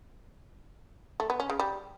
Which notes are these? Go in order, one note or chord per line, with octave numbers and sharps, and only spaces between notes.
A3
B3
C#4
C#3
G3